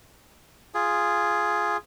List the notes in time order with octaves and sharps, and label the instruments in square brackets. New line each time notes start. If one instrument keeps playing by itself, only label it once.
[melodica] F4 G#4